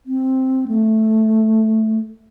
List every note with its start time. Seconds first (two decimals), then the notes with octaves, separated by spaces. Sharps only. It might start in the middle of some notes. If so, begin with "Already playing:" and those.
0.06 C4
0.68 A3